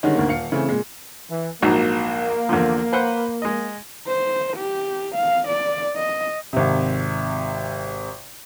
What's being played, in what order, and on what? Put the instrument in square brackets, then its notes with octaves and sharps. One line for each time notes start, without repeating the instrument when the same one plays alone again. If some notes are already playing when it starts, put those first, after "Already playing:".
[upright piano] D3 D#3 G3 G#3 C#4 D#4
D2 D3 D#3 A#3
D#1 F5 C#7
C#3 E3 A3 C4
A#2 G#3
[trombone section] E3
[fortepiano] A#1 G#2 F#3 [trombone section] A#3
[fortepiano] E2 D3 F3
B4 C5 F#5
G#3 D#5
[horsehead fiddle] C5
G4
F5
D5
D#5
[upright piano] G#1 C3